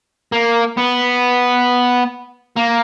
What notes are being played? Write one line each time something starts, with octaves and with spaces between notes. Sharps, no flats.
A#3
B3
A#3